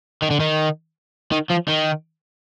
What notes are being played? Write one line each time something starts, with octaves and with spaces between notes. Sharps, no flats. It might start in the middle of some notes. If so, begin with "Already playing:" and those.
D#3
D3
D#3
D#3
F3
D#3